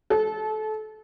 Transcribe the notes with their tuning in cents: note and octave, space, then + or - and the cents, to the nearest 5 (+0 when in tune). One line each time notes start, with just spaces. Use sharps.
A4 -25